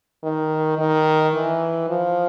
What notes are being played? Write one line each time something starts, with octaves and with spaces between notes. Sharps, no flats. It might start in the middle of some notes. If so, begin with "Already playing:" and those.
D#3
D#3
E3
F3